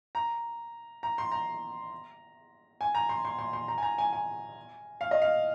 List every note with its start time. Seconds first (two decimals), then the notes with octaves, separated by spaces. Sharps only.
0.15 A#5
1.03 A#5
1.18 C6
1.32 A#5
2.81 G#5
2.95 A#5
3.09 C6
3.25 C6
3.39 C6
3.53 C6
3.68 A#5
3.78 G#5
3.83 A#5
3.98 G#5
4.13 G#5
5.01 F5
5.11 D#5
5.22 F5